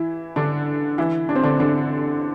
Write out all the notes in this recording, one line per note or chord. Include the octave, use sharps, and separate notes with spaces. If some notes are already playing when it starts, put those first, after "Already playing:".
Already playing: E3 E4
D3 D4
E3 E4
D4
C4
D3 D4
D3 D4